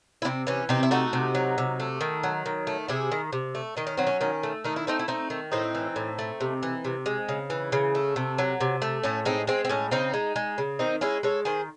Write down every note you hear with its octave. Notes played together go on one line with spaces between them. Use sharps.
E4
C3 C4 D#4
E3 C#4
C3 C4 D#4
E4
A3 D#4 F#4
C3
F#3
C3
A3
D#3
F#3
D#3
A3
C3 E4 G#4
D#3
C3
A3
D#3 D#4
C#4
F#3 C4
C#4
D#3 C#4
A3
D#3 D#4
E4
A3 C4 D#4
E4
A3 C4 D#4
D#3
A2 C4 D#4
E3
A2
A3
C3
E3
C3
G#3
C#3
E3
C#3
A3
C3
F#3
C3
A3
A2 C#4
G#3 C4 D#4
G#3 C4
C4
A2 C#4
C#3 C4 D#4
G#3
G#3
C#3
D#3 C4 D#4
G#3 C#4 E4
G#3 A4 C#5
D#3 G#4 C5